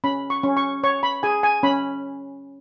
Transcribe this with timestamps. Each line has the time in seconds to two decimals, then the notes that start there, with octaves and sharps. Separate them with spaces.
0.04 C#4 B5
0.30 C#6
0.43 C#4
0.57 C#6
0.83 C#5 C#6
1.03 B5
1.23 G#4 G#5
1.43 G#5
1.63 C#4 B5